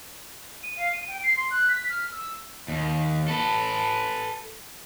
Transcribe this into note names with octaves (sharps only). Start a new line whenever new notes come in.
D#7
F5
D#7
G5
C7
C6
F#6
B6
F6
E6
D#2
A4 B4